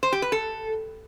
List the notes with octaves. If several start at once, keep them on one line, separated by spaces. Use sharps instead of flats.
C5
G4
B4
A4